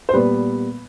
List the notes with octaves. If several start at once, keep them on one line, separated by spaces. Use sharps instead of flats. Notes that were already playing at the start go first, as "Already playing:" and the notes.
C5
A#2 G3 B3 B4